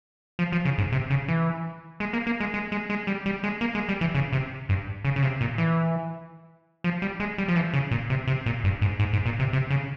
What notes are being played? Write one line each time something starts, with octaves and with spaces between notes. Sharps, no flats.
F3
F3
C#3
G#2
C3
C#3
E3
G#3
A#3
A#3
G#3
G#3
G#3
G#3
G3
G3
G#3
A#3
G#3
G3
E3
C#3
C3
G2
C#3
C#3
C3
A#2
E3
F3
G3
G#3
G3
F3
E3
C#3
A#2
C3
C3
A#2
G2
G#2
G#2
G#2
A#2
C3
C3
C#3